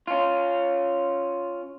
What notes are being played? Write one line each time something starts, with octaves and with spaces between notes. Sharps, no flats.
C#4 F4